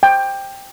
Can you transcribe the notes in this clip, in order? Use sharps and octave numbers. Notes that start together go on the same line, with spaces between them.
G5